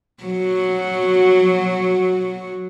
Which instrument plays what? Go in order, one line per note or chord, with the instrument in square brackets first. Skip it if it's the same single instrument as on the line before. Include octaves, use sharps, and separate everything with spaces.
[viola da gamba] F#3 F#4